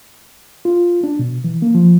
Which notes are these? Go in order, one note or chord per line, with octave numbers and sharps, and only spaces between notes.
F4
D4
B2
E3
A#3
F3